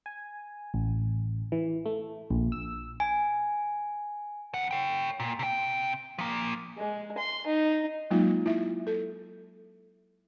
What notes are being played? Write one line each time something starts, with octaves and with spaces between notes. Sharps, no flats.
G#5
A1
E3
A3
A#1
E6
G#5
F2 F#5
C#5 G5
A#2
C3 G5
F3 A#3
G#3
C6
D#4
F#3 G#3 A#3 D#4 F4
E4 E5
A4